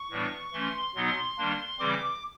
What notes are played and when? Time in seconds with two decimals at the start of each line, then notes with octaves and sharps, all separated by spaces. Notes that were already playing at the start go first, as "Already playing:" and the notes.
Already playing: C#6
0.10 A2 E3 G3 B3 D4
0.53 E3 A3 C#4 C6
0.95 B2 F#3 B3 D#4 C6
1.38 D#3 G3 A#3 D4
1.79 C#3 E3 G3 C4 D6